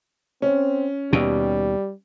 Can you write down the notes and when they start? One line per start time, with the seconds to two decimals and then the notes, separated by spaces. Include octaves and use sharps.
0.42 C4 C#4
1.13 D#2 B2 G3